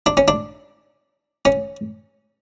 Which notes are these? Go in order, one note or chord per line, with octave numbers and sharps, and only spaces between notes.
D4
C#4
D4
C#4